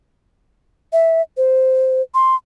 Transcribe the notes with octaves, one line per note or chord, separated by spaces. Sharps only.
E5
C5
C6